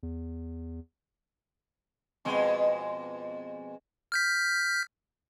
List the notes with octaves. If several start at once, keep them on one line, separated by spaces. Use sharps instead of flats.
E2
F2 B2 G#3
F6 G6 B6